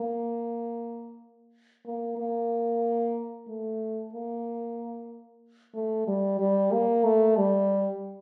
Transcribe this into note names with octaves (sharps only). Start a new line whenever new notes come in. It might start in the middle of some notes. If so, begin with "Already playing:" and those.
Already playing: A#3
A#3
A#3
A3
A#3
A3
G3
G3
A#3
A3
G3